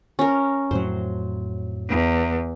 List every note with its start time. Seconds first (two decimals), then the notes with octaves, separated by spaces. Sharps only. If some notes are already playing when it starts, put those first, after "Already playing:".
0.19 C#4 A#4
0.71 F2 A2 F#3 C5
1.90 E2